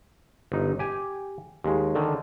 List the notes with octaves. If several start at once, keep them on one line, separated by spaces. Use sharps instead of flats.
G1 D#4
G4 G#5
D#2 G#3
D3 D#3